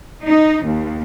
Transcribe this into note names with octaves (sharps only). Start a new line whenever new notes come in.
D#4
D#2